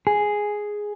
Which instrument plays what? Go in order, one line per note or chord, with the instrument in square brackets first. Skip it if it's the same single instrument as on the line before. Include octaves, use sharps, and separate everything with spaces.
[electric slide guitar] G#4